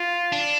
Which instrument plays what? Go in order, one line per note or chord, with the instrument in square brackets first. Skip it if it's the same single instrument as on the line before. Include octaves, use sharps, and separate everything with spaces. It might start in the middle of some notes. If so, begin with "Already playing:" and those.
Already playing: [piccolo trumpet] F4
[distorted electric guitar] D4